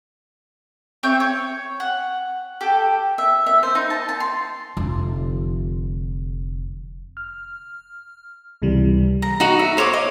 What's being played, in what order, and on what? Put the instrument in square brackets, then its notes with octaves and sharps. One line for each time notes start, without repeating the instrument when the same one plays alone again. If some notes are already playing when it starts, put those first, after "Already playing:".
[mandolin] C4 C#5 E5 G6
C#5
F#5
G4 A4
[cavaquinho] E5
E5
C5
D#4
A5
A5
C6
[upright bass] F1 D3
[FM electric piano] F6
C#2 C3 E3 G3
[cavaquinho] A#5
D#4 F#4 A#5
E5
C5 C#5 A#5 D6
D#5